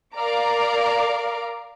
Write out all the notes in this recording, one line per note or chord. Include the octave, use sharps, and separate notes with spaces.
A#4 D5 F5 A#5 D6